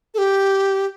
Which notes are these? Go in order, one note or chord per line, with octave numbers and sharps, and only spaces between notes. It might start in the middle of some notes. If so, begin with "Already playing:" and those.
A4
G4